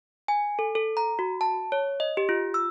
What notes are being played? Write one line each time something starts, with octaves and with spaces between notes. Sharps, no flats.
G#5
A4
A4
A#5
F#4
A5
C#5
D#5
G4
F4
E6